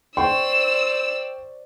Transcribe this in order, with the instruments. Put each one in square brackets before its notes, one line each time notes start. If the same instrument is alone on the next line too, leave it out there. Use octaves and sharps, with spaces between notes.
[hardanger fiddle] C5 D5 [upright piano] G5 C6 C#6 [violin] E6